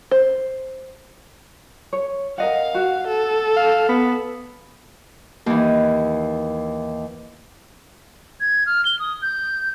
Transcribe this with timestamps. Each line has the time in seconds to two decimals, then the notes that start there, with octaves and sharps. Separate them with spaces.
0.11 C5
1.93 C#5
2.38 A#4 D#5 F5 F#5
2.75 F#4
3.07 A4
3.56 F5
3.89 B3
5.46 D#2 E3
8.40 G#6
8.66 F6
8.85 G7
8.99 D#6
9.22 G6